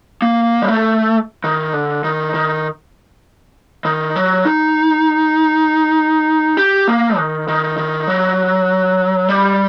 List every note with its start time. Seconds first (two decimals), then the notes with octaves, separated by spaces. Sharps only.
0.22 A#3
0.62 G3
0.69 A3
1.44 D#3
1.73 D3
2.04 D#3
2.34 D#3
3.85 D#3
4.16 F#3
4.45 D#4
6.57 G4
6.88 A#3
7.18 D#3
7.48 D#3
7.77 D#3
8.07 F#3
9.29 G3